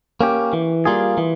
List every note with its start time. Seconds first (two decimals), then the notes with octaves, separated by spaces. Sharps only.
0.21 A#3 C#4 G4
0.53 E3
0.85 G3 A#3 F4 G#4
1.18 E3